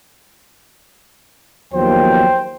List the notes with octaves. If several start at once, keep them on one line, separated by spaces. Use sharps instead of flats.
D#2 F3 F#3 B3 C5 G5